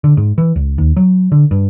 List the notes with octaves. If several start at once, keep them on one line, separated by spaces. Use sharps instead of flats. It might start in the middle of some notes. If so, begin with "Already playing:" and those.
D3
G#2
E3
C#2
D#2
F#3
D3
G2